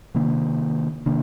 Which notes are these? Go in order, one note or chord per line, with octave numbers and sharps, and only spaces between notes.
C3 D#3 A#3 D4
C3 D#3 A#3 D4